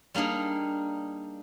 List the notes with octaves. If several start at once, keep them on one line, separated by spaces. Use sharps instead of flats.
G3 A#3 D4 D#4 G#4